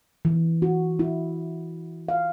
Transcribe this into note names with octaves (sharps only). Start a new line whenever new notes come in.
E3
F#4
E4
F5